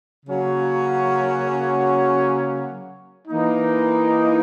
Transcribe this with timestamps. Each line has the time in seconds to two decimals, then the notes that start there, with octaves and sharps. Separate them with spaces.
0.25 C#3 F#3 A#3 C#4 F#4
3.27 E3 A#3 D#4